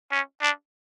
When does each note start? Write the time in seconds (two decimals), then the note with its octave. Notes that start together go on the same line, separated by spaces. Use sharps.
0.11 C#4
0.42 D4